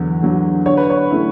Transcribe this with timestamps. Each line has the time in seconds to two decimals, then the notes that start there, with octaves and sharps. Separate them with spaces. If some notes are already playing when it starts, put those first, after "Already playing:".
Already playing: E2 D3 F#3
0.22 D3 F#3
0.66 D3 C#5
0.77 B4
0.90 C#5
1.10 A3 C#4 E4